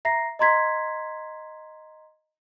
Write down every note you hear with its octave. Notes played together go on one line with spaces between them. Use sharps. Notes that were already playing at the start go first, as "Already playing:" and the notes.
E5 A#5 A#6 C7
D#5 A#5 C6 G#6 B6